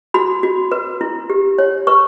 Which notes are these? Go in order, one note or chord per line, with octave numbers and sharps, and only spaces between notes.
F#4 B5
F#4
B4
E4
G4
C#5
B4 C#6